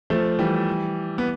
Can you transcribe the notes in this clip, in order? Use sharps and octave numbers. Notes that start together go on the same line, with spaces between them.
F3 A3
E3 G3
B3